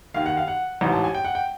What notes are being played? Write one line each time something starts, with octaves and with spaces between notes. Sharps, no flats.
D#2 D#3 F5
F#5
F5
F#5
A1 G#2 E3 A#5
A5
G#5
G5
F#5
G5